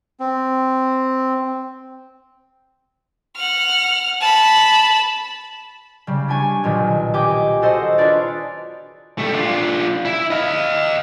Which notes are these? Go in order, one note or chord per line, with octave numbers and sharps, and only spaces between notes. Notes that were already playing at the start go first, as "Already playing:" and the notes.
C4
F#5 F6
A5 B5
C#3 G3
D4 G4 G#5 C#6
B1 A#2 D#3
G4 C#5 D#5 G5 G#5 D6
F#4 A4 C5 D#5 F#5
D4 F4 G#4 B4 C#5 D5
G3 A3
D4 F4
E4
D#5 F5